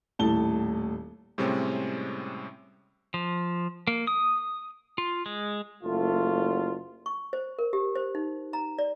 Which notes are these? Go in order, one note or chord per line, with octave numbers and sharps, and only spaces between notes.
D#1 A2 A5 G7
A2 C3 G3 G#3 C4 C#4
F3
A#3
D#6
F4
G#3
F#1 A3 F4
C#6
C5
A#4
G4
C5
D#4
A#5
D5